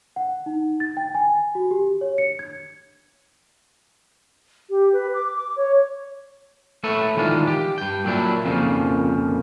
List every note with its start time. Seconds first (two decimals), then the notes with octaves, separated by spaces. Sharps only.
0.16 F#5
0.46 D#4
0.80 A6
0.97 G5
1.14 G#5
1.55 F#4
1.71 G4
2.01 C#5
2.18 C#7
2.39 G#6
4.70 G4
4.93 B4
5.14 D6
5.35 D6
5.57 C#5
6.84 A3 A4 B4 C#5 E5
7.17 D#3 E3 G#3 D4 F4
7.47 G4
7.78 G2 G5
8.04 A#2 F#3 D4 E4
8.45 F2 A#2 C#3 F3